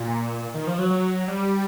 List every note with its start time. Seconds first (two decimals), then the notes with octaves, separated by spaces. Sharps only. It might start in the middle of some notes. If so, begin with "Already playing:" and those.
Already playing: A#2
0.54 D#3
0.67 F3
0.79 F#3
0.91 F#3
1.28 G3